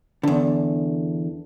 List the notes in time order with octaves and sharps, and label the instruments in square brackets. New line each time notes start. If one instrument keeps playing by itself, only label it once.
[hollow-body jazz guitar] E2 D3